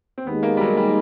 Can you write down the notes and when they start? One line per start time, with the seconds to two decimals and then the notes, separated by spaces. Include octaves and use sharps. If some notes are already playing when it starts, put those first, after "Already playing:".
0.18 C4
0.26 D#2 D#3 G#3 B3
0.43 A#3
0.57 G3
0.61 F#3
0.77 G3